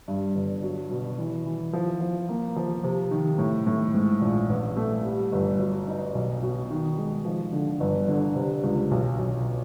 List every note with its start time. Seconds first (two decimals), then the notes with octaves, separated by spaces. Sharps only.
0.08 G2
0.35 G1
0.63 F#3
0.91 B2
1.18 E3
1.45 E3
1.73 F3
2.01 F3
2.29 A#3
2.56 F3
2.84 C3
3.11 D#3
3.39 A2
3.67 A2
3.94 G#2
4.21 A#1
4.49 A1
4.77 A3
5.04 G3
5.32 G1
5.60 F#3
5.87 D#4
6.15 B1
6.42 B2
6.70 D#3
6.98 G#3
7.25 F3
7.53 D3
7.80 G1
8.08 D3
8.35 C3
8.64 C#2
8.91 B1
9.19 B1